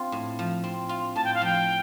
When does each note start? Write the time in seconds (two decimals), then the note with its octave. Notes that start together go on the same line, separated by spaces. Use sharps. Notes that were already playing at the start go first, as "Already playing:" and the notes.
Already playing: C4 F4
0.12 A2
0.39 F3
0.64 C4
0.89 F4
1.16 A2 A5
1.25 G5
1.35 F5
1.42 F3 G5